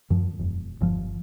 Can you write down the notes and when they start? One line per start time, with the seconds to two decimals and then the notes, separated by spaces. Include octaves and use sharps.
0.10 F#2 F3
0.39 E1
0.81 G1 F3